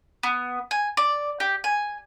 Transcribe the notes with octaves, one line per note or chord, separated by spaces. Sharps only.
B3
G#5
D5
G4
G#5